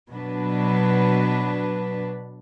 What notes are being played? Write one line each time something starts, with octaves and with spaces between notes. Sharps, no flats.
B2 F#3 D4 B4